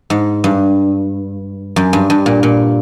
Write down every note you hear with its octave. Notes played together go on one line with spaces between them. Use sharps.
G#2
G2
F#2
G2
G2
A#2
A#2